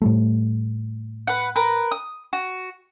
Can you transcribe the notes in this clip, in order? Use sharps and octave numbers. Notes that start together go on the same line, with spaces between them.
A2 G3 A3
B4 F#5
A#4 B4
D#6
F#4